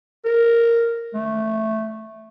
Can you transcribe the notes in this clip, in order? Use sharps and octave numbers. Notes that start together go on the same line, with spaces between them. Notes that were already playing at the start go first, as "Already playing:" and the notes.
A#4
A3